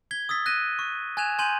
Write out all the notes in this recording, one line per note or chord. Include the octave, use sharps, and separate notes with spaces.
G#6 B6 G7
D#6 E6 A6 B6
F#6 A#6 D#7
C#6
G#5 F#6 G#6 E7 F7
G#5 C6 G6 D#7 F#7